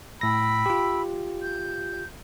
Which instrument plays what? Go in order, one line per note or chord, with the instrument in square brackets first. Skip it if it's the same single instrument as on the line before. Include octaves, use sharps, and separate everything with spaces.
[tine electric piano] A2 A#6 [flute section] G5 B5 E6
[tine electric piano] F4 G4
[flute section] G6